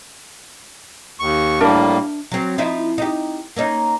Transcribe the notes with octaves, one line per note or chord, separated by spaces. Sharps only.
D#2 C#6
A2 G3 A#3 D4 A#4 E5
F#3 C4
F3 D#4 E4
D#4 G4
A#3 C#4 D#4